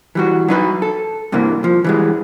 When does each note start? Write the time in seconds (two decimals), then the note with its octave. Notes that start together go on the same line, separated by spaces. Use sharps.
0.15 E3 G3 F#4
0.48 F#3 D#4 B4
0.82 A4
1.32 G2 C3 E3 A#3
1.64 F3
1.84 E3 G3 G#3